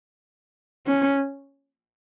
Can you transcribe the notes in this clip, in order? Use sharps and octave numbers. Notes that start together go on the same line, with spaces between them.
C#4